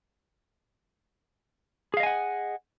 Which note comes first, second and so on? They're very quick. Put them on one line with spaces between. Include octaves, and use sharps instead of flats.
G#4 F5 D#5 G#5 F#5